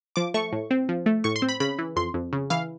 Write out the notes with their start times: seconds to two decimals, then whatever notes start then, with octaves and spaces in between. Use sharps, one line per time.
0.16 F3 D6
0.34 A3 C#6
0.53 A2
0.71 C4
0.89 F3
1.06 A3
1.24 A2 C#6
1.36 C6
1.42 C4
1.49 B5
1.60 C#3 B5
1.79 E3
1.96 F2 C6
2.14 F2
2.33 C#3
2.50 E3 F5